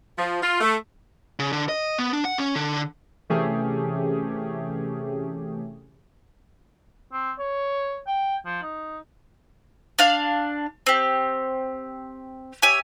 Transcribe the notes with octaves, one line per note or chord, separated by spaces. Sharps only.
F3
F4
A3
C#3
D3
D#5
B3
D4
F#5
C#4
D3
C3 E3 A3 C#4 G4 G#4
C4
C#5
G5
F3
D#4
D4 F5 F6
C4 G4
G4 C#5 E5 G#5